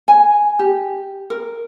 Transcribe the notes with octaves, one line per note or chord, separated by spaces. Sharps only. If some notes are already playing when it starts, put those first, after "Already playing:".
G#5
G4
A#4